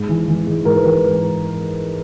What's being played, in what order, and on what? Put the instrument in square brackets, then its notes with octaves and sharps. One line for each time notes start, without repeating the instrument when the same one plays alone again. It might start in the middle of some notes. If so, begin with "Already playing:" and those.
Already playing: [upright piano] G#2
E3
E3
G#2
G#2 A#4
B4
E3 A#4